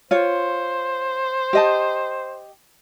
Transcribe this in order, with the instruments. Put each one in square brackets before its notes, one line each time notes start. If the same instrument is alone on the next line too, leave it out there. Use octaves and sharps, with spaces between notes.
[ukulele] F4 C#5 [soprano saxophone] C5
[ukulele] G4 D#5 A5